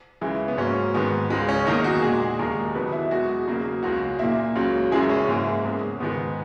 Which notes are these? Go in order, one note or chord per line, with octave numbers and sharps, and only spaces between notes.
C#2 C#3 E3 G#3
B3
G#2 F#3 A#3 C#4
G#2 D#3 G#3 B3
C#2 C#3 G#3
C#4
E2 D#3 A#3 D#4
F#4
A#2 G#3 G#4
D#2 D#3 G#3 A#4
E2 D#3 F#3 B4
E4
E2 B2 G#3 F#4
E2 C#3 F#3 A#3
C#2 C#3 G#3 F#4
A#2 A#3 E4
C#2 C#3 F#3
F#2 C#3 E3 G#3 G#4
C#4
G#2 E3 A#3
E2 C#3 G#3
G#2 D#3 G#3 B3